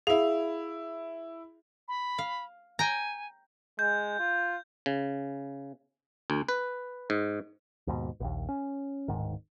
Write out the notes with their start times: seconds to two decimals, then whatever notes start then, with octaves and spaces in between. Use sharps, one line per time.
0.07 E4 G#4 F5 F7
1.88 B5
2.18 F5
2.79 G5 G#5 A#5
3.79 G#3 G6
4.19 F4
4.86 C#3
6.30 D2
6.49 B4
7.10 G#2
7.87 D#2 G#2 B2
8.20 A#1 D#2
8.49 C#4
9.08 D1 A#1 G#2 D#3